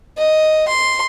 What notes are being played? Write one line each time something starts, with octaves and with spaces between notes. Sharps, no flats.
D#5
C6